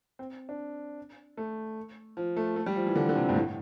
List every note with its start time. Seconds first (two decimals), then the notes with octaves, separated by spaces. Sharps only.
0.19 C4
0.49 D4
1.37 A3
2.17 F3
2.37 A3
2.56 A3
2.66 G3
2.76 F3
2.86 E3
2.96 D3
3.09 D3
3.15 C3
3.29 G2
3.35 A2